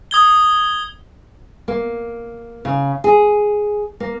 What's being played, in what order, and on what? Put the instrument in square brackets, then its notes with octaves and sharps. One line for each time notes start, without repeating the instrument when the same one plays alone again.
[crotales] D#6 G#6 G7
[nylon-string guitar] A#3
C#3
G#4
A#3